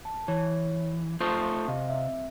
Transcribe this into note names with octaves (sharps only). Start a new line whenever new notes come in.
A5
E3 C#5
A3 F4 C5 A5 C#6 D#6
C3 D#5 F5
C4 E5